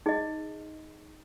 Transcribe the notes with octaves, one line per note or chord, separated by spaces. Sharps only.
D#4 G#4 D#5